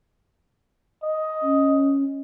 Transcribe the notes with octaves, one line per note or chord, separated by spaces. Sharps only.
D#5
C#4